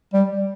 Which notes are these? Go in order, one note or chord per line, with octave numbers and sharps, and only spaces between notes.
G3